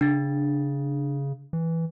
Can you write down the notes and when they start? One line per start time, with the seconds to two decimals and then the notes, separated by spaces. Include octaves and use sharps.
0.01 C#3 D4 A6
1.53 E3